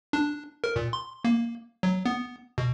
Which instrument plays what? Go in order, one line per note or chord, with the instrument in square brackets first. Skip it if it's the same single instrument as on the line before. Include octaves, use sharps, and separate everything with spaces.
[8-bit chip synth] D4
A#4
A#2
C6
A#3
F#3
B3
B2